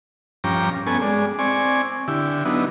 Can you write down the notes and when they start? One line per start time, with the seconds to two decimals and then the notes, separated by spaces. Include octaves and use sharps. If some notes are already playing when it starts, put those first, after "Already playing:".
0.44 G2 F3 C#4 G5 A#5 D6
0.87 B3 C#4 A4 G#5
1.02 G#3 D5
1.39 C4 D5 G#5 C#6
2.08 D3 E4 G4
2.45 F#3 B3 D4 D#4